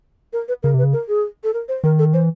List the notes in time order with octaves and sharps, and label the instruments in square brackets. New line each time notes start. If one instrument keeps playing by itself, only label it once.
[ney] A#4
B4
[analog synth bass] C#3 [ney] A#4
[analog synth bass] C3 [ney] B4
[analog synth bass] C#3
[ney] A#4
G#4
A4
A#4
C5
[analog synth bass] D#3 [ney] A#4
[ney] A4
[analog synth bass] E3 [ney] C5